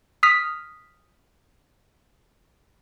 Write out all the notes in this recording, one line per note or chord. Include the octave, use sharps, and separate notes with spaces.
D#6 F6 B6